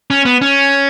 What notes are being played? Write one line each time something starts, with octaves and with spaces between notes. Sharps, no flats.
C#4
B3
C#4